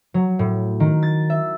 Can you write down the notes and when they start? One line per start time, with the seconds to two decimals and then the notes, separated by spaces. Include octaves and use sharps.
0.14 F#3
0.39 A2
0.80 D#3
1.03 A6
1.30 E5